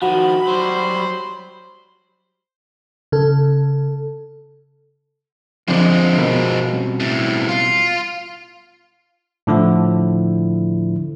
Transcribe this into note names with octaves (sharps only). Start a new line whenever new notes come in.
D#3 F3 F#4 B5
F#3 G3 C5 C6
C#3 A4
F2 D3 F3 G#3
B2 A#4 D#5
G3 C4 C#4
E2 A2
F4
A2 D3 F3 E4